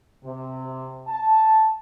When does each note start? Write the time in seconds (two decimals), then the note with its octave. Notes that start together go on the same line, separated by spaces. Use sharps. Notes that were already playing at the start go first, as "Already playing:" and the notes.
0.24 C3
1.08 A5